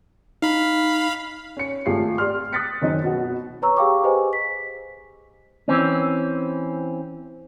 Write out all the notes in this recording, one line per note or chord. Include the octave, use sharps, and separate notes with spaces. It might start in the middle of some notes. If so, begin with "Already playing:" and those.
D#4 F5 B5
C#4 C#7
G#1 A3 F4 G4 G#4 C7
G4 D5 C6 F6
D#6 F#6 A6 B6 C#7
F#2 D#3 C4 D#4
B2 F#4
B4 C#5 A#5 C#6 E6
G4 G#4 F5 G5 C#6 D6
G4 G#4 B4 C5 D#5 G#5
B6
E3 C4 C#4